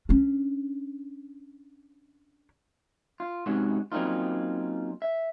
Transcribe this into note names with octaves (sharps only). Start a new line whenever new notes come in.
C#4 D4
F4
G#2 C3 C#4 F#4
F#3 A#3 C4 C#4 D#4 F4
E5